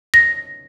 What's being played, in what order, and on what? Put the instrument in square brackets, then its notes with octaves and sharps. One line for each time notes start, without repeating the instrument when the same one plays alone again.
[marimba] A#6